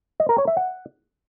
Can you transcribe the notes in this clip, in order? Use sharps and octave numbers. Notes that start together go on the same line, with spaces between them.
D#5
A#4
C#5
E5
F#5